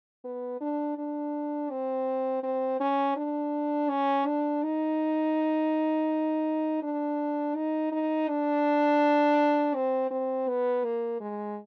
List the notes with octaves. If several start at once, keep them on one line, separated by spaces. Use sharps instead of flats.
B3
D4
D4
C4
C4
C#4
D4
C#4
D4
D#4
D4
D#4
D#4
D4
C4
C4
B3
A#3
G#3